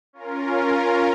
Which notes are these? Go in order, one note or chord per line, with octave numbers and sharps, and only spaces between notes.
C#4 F4 A#4